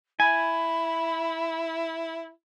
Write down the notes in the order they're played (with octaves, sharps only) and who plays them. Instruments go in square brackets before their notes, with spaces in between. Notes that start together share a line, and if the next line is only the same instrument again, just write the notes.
[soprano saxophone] E4 [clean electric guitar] G#5 [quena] B5